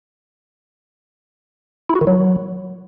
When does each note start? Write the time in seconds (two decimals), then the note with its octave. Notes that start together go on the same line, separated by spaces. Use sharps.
1.89 E4
1.95 F#4
2.01 D#3
2.07 F#3